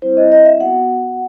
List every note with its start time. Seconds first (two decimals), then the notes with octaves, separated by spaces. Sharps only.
0.02 G3 C4 E4 C5
0.17 D#5
0.32 D#5
0.45 E5
0.60 B3 F#4 F#5